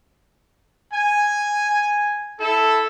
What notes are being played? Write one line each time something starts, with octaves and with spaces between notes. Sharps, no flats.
G#5
E4 A4